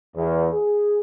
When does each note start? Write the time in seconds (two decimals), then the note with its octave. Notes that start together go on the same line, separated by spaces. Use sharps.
0.16 E2
0.53 G#4